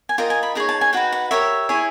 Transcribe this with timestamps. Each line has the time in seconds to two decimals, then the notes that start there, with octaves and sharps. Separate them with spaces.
0.09 G#5
0.18 F4 A#4 D#5 G5
0.30 G#5
0.43 B5
0.55 D#4 G#4 C#5 A#5
0.69 A5
0.81 G#5
0.93 D#4 F#4 B4 G5
1.12 F#5
1.31 G4 A#4 C#5 E5
1.69 E4 G#4 C#5